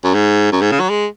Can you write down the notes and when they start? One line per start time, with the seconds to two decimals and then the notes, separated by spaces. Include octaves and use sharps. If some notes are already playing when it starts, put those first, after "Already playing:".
0.04 F#2
0.14 G#2
0.52 F#2
0.62 G#2
0.72 C#3
0.80 F#3
0.89 G#3